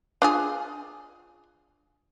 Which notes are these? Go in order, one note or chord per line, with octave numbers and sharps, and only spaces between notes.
D4 F4 G#4